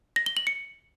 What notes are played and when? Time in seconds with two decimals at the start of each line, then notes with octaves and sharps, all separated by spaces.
0.16 A#6
0.26 G7
0.37 F#7
0.47 C#7